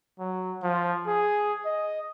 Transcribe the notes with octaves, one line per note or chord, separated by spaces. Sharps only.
F#3
F3
G#4
D#5